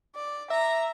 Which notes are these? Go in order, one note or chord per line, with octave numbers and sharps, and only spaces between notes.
D5
E5 A#5